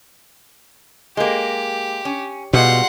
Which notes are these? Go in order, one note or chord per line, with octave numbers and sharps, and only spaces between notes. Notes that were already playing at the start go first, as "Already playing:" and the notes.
G#3 A#3 G4
C#4
B2 G3 G#3 F4 F#5 C6